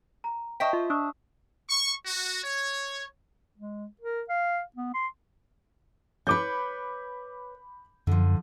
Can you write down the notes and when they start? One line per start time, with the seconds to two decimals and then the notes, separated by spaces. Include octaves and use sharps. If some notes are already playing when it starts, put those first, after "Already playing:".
0.24 A#5
0.60 C5 D#5 E5 G5 A5 C#6 B6
0.73 F4
0.90 D4 C#6 D#6 E6
1.69 C#6
2.06 F#4
2.43 C#5
3.58 G#3
4.02 A#4
4.29 F5
4.76 B3
4.94 C6
6.27 B4 C#5 B5 D6 G6
8.07 F#2 D3 F3